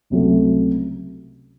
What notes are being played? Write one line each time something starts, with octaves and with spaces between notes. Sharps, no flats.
C#2 C3 F#3 A3